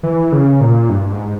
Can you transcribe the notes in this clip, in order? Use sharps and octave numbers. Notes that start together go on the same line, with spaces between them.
E3
C#3
A#2
G2
G#2